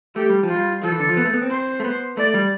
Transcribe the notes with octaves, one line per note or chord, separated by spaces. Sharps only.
A3 G4
G3
F3
F4
G3
F3 A4
E3
D3
F3
B3
A3
B3
C4
C5
A3
B3
A3 D5
G3